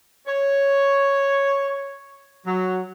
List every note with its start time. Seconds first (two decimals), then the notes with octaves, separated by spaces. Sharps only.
0.27 C#5
2.47 F#3